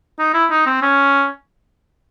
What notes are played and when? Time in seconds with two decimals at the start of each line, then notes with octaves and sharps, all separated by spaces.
0.19 D#4
0.34 E4
0.51 D#4
0.66 C4
0.82 C#4